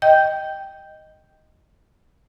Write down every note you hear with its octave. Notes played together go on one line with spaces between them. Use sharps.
D#5 G5 G6